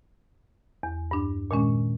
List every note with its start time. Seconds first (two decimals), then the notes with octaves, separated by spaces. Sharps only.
0.83 E2
1.11 G2 D4
1.51 A#2 D#3 G#3 C#4